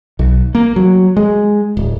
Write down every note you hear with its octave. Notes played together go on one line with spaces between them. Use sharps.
B1
A#3
F#3
G#3
D1